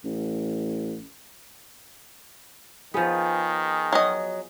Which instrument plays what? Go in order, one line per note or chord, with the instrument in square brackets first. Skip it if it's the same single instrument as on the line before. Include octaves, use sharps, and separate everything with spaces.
[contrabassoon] A1
[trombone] D#3 [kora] F3 B3 [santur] G#4
[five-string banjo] F#3 D#5